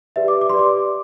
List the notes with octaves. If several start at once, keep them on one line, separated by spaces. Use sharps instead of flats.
G4 B4 D5 E5
D6
D6
G4 B4 D5 C6
D6